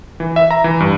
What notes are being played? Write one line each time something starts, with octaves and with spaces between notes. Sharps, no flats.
E3
E5
A#5
E3
G2